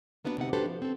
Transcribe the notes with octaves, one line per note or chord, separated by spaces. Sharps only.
A#3 B3 D4 E4 F#4 B4
D2 C3 D#4 F#5
D4 F#4 G4 A4 B4 C5
F3
C4 A4